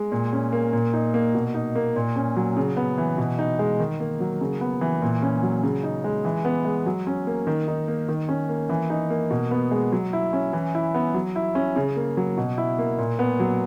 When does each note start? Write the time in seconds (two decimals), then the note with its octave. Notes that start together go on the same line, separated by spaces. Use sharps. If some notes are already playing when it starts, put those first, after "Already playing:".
Already playing: G#3
0.12 A#2
0.33 C#4
0.52 A#3
0.73 A#2
0.93 D#4
1.14 A#3
1.34 B2
1.54 D#4
1.75 A#3
1.96 A#2
2.16 C#4
2.36 F#3
2.57 C#3
2.77 B3
2.98 E3
3.18 B2
3.39 D#4
3.59 G#3
3.79 D#3
4.00 A#3
4.20 F#3
4.41 C#3
4.61 B3
4.81 E3
5.02 A#2
5.22 C#4
5.43 F#3
5.63 C#3
5.83 D#4
6.04 G#3
6.25 E3
6.45 B3
6.65 G#3
6.86 F#3
7.07 C#4
7.27 A#3
7.47 D#3
7.68 D#4
7.88 A#3
8.08 D#3
8.29 C#4
8.49 A#3
8.69 E3
8.90 D#4
9.10 A#3
9.31 B2
9.51 B3
9.71 G#3
9.92 F#3
10.13 E4
10.33 C#4
10.53 E3
10.75 E4
10.94 B3
11.14 F#3
11.36 E4
11.55 C#4
11.76 C#3
11.96 A#3
12.17 F#3
12.37 B2
12.58 E4
12.79 A#3
12.98 A#2
13.19 B3
13.40 F#3